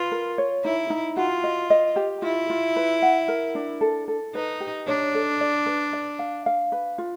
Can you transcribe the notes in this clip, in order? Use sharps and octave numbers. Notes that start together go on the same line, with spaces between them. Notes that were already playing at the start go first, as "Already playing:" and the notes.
Already playing: F4 B4
A#4
C#5
D#4 E4
D#4
F4 F#4
D#5
D#5
G4
E4 F4
F4
B4
F#5
A#4
D4
A4
A4
D#4 B4
G4
D4 C#5
A4
D5
B4
D5
F5
F5
B4
F4